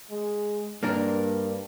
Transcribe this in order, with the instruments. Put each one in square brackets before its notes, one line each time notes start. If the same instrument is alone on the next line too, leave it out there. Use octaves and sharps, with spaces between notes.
[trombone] G#3
[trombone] G2 [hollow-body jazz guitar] A#3 D4 A#4